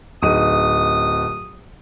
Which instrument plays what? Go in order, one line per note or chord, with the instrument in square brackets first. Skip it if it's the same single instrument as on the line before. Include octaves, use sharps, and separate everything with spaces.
[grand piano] D1 D#4 D#7 [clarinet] D#6